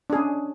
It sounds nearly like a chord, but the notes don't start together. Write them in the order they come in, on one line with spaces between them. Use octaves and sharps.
D4 G#4 C#4